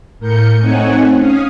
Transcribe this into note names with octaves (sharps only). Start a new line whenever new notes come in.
A2 A#4 G6 C#7
A3 C4 D#4 C#5 F#5 G#5
C#4 F5 D#6